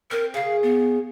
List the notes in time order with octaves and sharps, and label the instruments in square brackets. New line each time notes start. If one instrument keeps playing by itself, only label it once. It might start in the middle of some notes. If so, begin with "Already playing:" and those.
[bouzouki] C4 [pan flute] A#4
[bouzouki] C#3 G#4 [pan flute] F5
[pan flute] B3